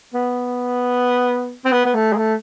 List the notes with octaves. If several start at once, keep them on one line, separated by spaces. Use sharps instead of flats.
B3
C4
B3
B3
A3
G#3
A3